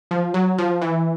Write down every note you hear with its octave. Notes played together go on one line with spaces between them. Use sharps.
F3
F#3
F3
E3